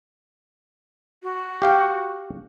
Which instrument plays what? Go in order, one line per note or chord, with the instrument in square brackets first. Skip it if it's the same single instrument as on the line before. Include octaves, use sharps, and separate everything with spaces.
[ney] F#4
[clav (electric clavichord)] G4 F5 G5